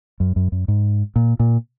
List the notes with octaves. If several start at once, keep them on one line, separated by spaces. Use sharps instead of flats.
F#2
F#2
F#2
G#2
A#2
A#2